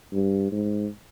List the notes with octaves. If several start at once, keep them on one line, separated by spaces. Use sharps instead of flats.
G2
G#2